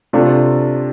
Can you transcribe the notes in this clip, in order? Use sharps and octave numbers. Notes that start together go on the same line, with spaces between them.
C3 A3 D4 F4